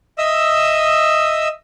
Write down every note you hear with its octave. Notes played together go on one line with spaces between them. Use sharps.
D#5 E5 D#6 E6